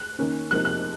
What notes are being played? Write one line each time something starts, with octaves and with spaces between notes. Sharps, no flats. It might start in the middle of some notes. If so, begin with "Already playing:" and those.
Already playing: F#6
D#3 A#3 C#4
C3 F3 A#3 D#4 F#6
F#6